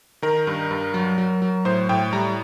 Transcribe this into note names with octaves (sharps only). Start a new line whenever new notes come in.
D#3 A#4
G2
G2
F#3
F#3
F#3
A2 C5
A2 G5
G3 A#5